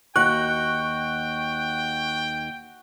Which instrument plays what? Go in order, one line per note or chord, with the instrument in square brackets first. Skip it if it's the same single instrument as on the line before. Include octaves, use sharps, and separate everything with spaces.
[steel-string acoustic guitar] D#2 [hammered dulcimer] F#4 [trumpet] G5 [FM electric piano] C#6 F#6